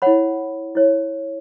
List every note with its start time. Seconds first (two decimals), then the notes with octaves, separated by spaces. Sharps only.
0.02 E4 C#5 F#5 B5
0.75 E4 C#5